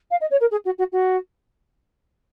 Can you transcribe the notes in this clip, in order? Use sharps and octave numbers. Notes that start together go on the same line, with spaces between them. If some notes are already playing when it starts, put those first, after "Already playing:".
F5
D#5
C#5
A#4
G#4
F#4
F#4
F#4